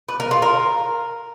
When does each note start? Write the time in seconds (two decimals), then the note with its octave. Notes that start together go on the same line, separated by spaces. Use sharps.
0.08 B4
0.20 A#4
0.31 F4
0.42 A#4